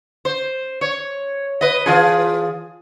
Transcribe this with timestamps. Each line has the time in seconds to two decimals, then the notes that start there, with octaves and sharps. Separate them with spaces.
0.25 C5
0.81 C#5
1.61 B4 D#5
1.86 E3 F4 G#4